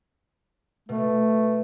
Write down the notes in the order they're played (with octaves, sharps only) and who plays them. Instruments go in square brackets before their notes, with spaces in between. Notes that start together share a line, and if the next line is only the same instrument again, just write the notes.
[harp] B2 [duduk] A3